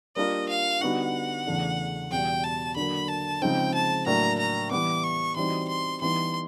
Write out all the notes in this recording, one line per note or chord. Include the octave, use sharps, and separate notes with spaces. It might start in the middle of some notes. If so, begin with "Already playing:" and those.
G3 A#3 D4 F4 A#4 D#5
F5
D3 G3 B3 D#4 F#4 F#5
E2 C#3 E3 A3 D4
E2 B2 G3 G5
A5
D3 F#3 A#3 B5
A5
C#3 F3 G#3 C4 D#4 G5
A5
A2 F#3 A#3 D4 A#5
A#5
E3 G3 B3 D6
C#6
E3 G3 C4 D#4 F#4 C6
C6
E3 G3 B3 D#4 C6